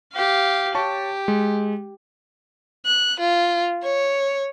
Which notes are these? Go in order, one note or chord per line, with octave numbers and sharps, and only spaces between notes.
G4 F5
G4 C#5 A5 C#6
G#3
F#6
F4
C#5